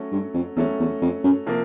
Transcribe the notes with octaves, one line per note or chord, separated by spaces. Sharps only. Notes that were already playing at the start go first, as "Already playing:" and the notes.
Already playing: F#3 A3 C#4
G2
F2
E2 F#3 A3 C#4
E2
F2
F#2
C3 F3 A#3